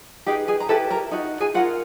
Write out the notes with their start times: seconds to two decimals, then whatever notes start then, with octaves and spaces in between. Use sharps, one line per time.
0.26 D#4 G4 G#4 B4 G5
0.48 G#4 G#5
0.60 A#5
0.69 E4 G4 A4 B4 A5
0.90 A#4 A#5
1.11 D#4 F#4
1.40 G#4 G#5
1.54 F4 F#4 A#4 F#5